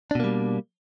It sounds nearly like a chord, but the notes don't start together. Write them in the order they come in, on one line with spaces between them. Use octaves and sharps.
D4 B2 A#3 G3